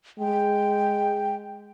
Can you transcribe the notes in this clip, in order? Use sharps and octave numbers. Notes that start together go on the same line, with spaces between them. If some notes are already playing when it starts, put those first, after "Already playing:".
G#3 G5